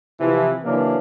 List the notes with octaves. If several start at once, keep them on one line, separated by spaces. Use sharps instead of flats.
C3 E3 F3
C#3 E3 F#3 A#3 C#4 D4